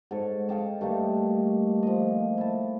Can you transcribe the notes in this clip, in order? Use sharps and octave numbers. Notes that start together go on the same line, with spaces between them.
G#2 A4 C#5
D#5 F5 G5 A5
G2 A3 A#3 D#4
F3 D#5
E4 A5